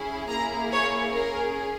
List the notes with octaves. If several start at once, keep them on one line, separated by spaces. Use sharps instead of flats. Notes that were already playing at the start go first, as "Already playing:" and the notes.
Already playing: C#4 E4 G#4
A#3 E4 G#4 A#5
C#5
C#4 G#4 A#4